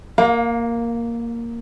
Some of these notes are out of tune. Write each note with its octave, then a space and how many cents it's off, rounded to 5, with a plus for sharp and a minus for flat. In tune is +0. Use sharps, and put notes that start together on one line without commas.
A#3 +0 F5 +30